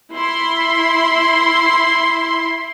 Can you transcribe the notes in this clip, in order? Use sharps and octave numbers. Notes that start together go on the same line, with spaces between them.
E4 B5 C6